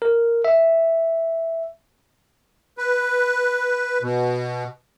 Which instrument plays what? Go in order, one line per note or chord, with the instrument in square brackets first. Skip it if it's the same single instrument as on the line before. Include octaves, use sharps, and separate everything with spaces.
[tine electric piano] A#4
E5
[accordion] B4
B2